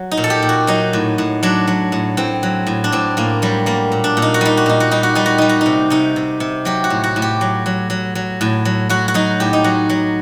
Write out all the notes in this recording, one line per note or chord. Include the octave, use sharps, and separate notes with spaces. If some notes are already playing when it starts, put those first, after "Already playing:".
Already playing: F#3
D#4
A#2
A4
G4
A#2
F#4
F#3 D#4
A2
A2
F#3 D4
F#3
A2
A2 C4
F#3
A2
D4
A2 C4
A2 A#3
F#3 G3
G3 A#3
A#2
D4
A#2
D#4
F#4
G3 D#4
F#4
A#2 D#4
F#4
G3 D#4
F#4
G3 D#4
F#4
G3 D#4
F#4
D#4
C3
C3 D#4
C3
C3
F#3 G4
F#4
A2
F#4
A2
G4
F#3
F#3
F#3
F#3
A2
F#3
F#3 F#4
F#4
F#3 D#4
A2 G4
D#4
F#3 F#4
F#3